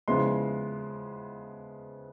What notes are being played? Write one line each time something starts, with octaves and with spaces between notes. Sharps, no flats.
C#3 F3 G#3 B3 E4 C6